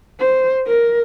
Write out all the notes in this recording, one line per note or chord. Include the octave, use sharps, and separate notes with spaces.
C5
A#4